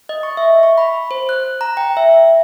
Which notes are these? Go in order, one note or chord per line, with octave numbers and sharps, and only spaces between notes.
D#5
C#6
E5
C#6
B5
C5
F#6
A#5
G5
E5